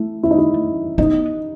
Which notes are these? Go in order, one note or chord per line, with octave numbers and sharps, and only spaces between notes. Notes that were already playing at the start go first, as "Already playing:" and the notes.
Already playing: A3 E4
E4
D#4
E4
B3 D#4